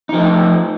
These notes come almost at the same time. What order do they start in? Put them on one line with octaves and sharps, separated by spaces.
D#4 F3 A3